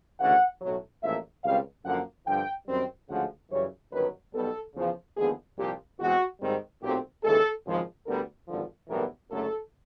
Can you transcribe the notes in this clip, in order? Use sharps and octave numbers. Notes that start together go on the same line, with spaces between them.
D2 C#3 E3 F#5
B1 A2 F#3
A1 G#2 F3 A#3 E5
C#2 B2 G3 C4 F5
F#2 D3 F3 A#3 F#5
G2 D3 F3 G5
F#2 D#3 G3 C4
D2 C#3 F3 G#3 F#5
F#2 C#3 E3 G3 C#5
G1 F#2 D#3 F#3 B4
B1 B2 G3 B3 A4
E2 C#3 F3
D#2 D3 F3 G#3 B3 G#4
C2 A#2 F3 G4
E2 B2 G#3 C4 F#4
G#2 D#3 G3 C4
B1 A#2 F#3 A3 C4 G4
D#2 C#3 E3 G#3 A4
G#1 F#2 C#3 F3 G#3
D2 D3 G3 B3 A#4
G#1 G2 D3 F3
B1 A2 E3 G3 B3 A#4
F#1 F#2 D3 F#3 A3 A4